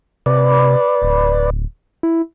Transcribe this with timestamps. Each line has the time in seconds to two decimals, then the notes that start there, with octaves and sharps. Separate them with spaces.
0.26 C3 B4 D5
1.02 D1
2.03 E4